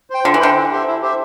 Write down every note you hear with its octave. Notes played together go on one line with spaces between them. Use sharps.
C5 G5
D3 F4
E3
D3 C5 G5
E4
G4 C5 E5
E4
G4 C5 E5